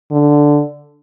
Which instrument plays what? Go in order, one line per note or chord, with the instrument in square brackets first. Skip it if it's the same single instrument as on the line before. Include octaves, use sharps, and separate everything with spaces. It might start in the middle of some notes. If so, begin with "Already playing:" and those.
[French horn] D3